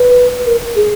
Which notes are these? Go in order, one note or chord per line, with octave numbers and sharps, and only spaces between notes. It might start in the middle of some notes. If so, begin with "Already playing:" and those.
Already playing: B4
A#4
G#4